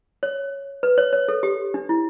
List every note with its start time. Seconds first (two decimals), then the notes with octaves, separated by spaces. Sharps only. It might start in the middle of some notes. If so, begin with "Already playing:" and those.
0.23 C#5
0.83 B4
0.98 C#5
1.13 C#5
1.28 A4
1.43 G4
1.74 D4
1.89 E4